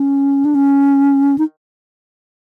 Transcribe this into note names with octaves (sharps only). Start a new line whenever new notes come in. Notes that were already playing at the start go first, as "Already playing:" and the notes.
Already playing: C#4
D4
C#4
D#4